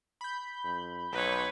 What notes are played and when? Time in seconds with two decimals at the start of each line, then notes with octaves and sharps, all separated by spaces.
0.21 B5 G6
0.64 F2
1.12 B1 B4 C#5